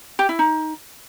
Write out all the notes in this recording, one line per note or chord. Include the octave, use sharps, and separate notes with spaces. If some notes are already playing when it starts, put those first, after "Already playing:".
G4
E4
D#4